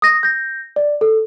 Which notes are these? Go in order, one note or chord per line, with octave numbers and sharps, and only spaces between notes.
D#6 A#6
G6 A#6
D5
A4